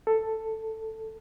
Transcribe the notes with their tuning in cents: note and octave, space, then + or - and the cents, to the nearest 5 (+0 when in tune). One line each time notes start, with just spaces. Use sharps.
A4 +5